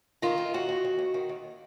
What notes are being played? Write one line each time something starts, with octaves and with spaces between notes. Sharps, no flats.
D#3 F4
D#3
D#2 F#4
D#2
D#2
D#2
D#3
D#2